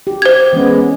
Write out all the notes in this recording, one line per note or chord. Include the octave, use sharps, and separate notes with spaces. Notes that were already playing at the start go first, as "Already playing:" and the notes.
G4
C5 G#6
E3 G#3 B3 C#4